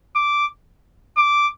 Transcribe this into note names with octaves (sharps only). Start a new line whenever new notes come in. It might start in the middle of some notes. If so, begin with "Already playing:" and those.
D6
D6